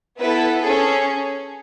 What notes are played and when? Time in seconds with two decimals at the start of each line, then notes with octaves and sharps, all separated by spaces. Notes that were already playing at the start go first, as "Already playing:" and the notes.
0.18 B3 E4 A4 B4
0.62 C#4 G#4 A4